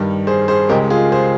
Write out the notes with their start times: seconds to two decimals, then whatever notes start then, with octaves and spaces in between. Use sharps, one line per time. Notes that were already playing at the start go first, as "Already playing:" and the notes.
Already playing: G2 D#3 G3
0.27 G#4 C5
0.48 G#4 C5
0.69 C#2 C#3 G#3 G4 A#4
0.90 F4 G#4
1.12 G#4 C5